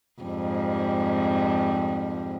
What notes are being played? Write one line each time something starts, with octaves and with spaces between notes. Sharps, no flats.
F2 G#2 G3